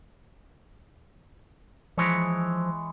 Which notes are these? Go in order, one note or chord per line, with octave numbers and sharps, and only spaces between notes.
E3 F3 G#3 C#5